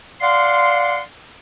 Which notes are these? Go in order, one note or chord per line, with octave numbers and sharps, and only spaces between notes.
D5 F5 F#5 C6